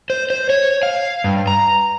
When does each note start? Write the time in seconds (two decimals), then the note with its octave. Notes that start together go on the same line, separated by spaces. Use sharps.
0.10 C5
0.30 C5
0.50 C#5
0.83 F5
1.24 G2
1.47 A#5